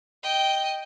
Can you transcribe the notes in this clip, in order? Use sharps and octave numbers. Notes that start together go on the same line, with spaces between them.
D#5 G5